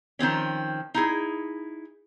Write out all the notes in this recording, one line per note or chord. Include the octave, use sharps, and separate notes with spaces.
D#3 F3 C4 C#4
D#4 E4 G#4